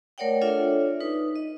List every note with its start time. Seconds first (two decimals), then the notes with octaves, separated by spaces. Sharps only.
0.18 A3 A#4 C#5 D5 F#5 G5
0.42 D4 F4 A4 C#5 D5 E5
1.01 D#4 B4
1.36 D#5